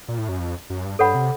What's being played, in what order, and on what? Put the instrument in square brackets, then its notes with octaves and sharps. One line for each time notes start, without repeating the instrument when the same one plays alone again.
[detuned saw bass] A#2
A2
F#2
F2
F#2
G2
[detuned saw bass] G2 [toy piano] A4 C#5 F#5 B5
[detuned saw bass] C3